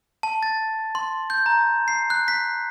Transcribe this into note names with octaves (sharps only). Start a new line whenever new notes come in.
A5
A6
C6
G6
A#5
C7
F#6
B6